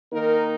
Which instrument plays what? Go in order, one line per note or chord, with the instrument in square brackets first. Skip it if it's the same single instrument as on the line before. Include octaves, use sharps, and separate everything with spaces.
[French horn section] D#3 A#3 D#4 A#4